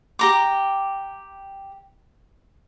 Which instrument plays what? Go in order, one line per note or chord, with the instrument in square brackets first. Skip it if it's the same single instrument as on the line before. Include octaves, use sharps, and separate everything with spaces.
[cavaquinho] G4 A#5 D6